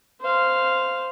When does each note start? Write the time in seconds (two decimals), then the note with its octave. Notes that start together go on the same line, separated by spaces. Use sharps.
0.21 C5 F5